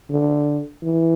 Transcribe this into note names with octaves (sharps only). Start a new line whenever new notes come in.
D3
E3